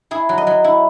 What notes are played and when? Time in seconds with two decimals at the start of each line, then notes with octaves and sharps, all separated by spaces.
0.11 E4 G#4
0.29 F#3
0.38 D#5
0.47 F#3
0.64 E4